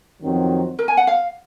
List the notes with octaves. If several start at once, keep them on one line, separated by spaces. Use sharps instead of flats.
F2 D#3 F#3 C4 F#4
A#4
G#5
F#5
F5